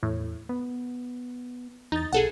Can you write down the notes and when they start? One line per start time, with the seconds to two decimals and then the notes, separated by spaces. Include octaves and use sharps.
0.03 E2 A2
0.49 B3
1.92 E2 D#4 A6
2.13 B1 G#4 A4 F#5